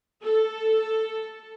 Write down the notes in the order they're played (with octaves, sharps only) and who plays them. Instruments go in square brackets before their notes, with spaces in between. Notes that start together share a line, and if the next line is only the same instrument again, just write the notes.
[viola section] A4